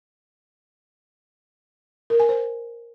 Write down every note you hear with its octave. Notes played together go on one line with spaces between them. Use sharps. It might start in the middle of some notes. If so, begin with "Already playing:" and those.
A#4
G#5
C5